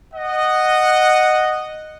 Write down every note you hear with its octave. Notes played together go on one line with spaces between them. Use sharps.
D#5 F#5